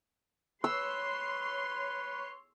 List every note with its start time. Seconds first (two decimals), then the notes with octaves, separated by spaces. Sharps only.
0.64 B4 C#5 C6 E6